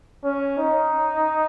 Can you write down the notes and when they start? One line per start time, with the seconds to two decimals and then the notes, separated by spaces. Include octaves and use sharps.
0.24 C#4
0.58 D#4